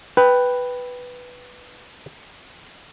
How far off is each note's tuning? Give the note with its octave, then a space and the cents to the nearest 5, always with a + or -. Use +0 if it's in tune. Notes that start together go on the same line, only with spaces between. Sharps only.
B4 +0 G5 +0